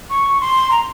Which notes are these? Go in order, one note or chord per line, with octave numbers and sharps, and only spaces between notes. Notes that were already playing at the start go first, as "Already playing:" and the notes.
C#6
C6
A#5